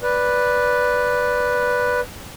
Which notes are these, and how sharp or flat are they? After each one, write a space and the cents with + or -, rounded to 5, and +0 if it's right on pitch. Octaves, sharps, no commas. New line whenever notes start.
B4 +0 D5 +0